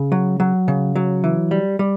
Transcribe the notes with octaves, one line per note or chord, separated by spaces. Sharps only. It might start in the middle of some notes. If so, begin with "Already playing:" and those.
Already playing: C#3
F#3
F#3
C#3
F#3
E3
G3
G3